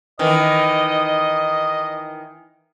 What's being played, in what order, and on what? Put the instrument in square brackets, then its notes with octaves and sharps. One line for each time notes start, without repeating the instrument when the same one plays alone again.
[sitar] D#3 E3 [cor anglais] D#5